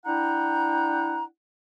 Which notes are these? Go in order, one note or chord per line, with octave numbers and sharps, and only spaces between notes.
D4 E4 F#5 G5 A#5